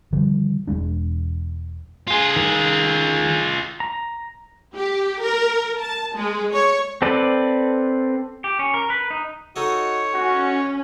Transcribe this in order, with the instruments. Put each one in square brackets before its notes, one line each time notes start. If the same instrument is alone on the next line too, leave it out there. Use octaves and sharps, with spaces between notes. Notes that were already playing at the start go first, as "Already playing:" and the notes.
[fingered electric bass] D3 D#3 F3 G3
E1 G#3 D4
[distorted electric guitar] F4 G#4
[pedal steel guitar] D#3
A#5
[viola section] G4
A#4
A5
G#3
C#5
[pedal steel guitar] C4 A4 B4 D5
[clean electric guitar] G4
C#4
A#4
B4
D#4
[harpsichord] D#4 A4 D#5 [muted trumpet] F#4 [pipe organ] C#5
[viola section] C#4 [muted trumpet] F#4